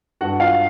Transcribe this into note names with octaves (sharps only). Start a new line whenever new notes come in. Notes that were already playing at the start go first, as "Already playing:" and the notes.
G2 F#4 F#5
F4 F5